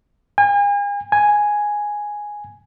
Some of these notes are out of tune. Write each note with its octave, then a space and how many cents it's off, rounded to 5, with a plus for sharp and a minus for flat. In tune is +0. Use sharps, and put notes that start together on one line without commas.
G#5 -40
G#5 +0